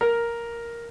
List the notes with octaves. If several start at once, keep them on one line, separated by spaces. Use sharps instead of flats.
A#4